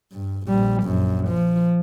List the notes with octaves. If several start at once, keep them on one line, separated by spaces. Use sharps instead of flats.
G2
A#1 G3
A#1 F#2
F3